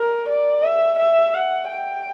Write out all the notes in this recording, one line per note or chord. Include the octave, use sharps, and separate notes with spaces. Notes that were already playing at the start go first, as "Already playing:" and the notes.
Already playing: A#4
D5
E5
E5
F#5
G5